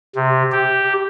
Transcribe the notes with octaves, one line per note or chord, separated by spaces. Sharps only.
C3
G4